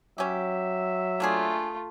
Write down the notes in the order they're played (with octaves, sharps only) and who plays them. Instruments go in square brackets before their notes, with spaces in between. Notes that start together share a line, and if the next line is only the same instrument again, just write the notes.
[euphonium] F#3 [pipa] C#4 G4 [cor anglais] E5
[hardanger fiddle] A3 F4 [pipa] A#3 D4 G#4